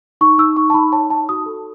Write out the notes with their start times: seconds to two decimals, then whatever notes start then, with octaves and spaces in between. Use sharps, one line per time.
0.21 D#4 C#6
0.38 D#4 E6
0.57 D#4 C#6
0.70 A5
0.74 D#4 B5
0.92 C#5 A5
1.10 D#4 A5
1.29 F#4 D#6
1.46 A4